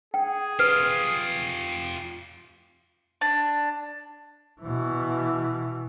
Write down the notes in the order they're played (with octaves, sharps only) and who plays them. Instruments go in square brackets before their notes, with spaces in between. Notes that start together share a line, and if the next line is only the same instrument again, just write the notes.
[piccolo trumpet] G#4 [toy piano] G5
[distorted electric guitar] F4 G4 [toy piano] B4
[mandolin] D4
[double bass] B2 E3